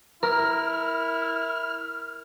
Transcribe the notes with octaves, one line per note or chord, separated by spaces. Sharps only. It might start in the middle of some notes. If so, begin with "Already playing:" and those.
E4 A#4 F6